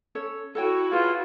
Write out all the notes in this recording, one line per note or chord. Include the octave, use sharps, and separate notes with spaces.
C#4 A4 C#5
E4 F#4 A4 C#5 G5
F4 G#4 B4 C#5